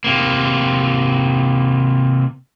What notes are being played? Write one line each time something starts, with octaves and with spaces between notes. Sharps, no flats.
C3 A#3